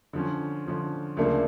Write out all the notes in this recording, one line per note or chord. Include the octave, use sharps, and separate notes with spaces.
D3 F3 C#4
D3 F3 C#4
D2 C#3 F3 A#3 D4